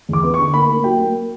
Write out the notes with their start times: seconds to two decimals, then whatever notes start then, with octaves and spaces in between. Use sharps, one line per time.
0.09 E2 D6
0.23 B3
0.34 C#6
0.39 D3
0.54 A#3 B5
0.69 A#3
0.84 F#3 G5
0.99 A#3